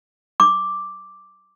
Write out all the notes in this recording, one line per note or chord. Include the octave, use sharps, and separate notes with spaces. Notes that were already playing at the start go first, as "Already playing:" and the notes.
D6